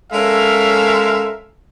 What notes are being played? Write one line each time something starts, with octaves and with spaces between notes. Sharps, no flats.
G#3 C#4 A4 A#4 E5 F5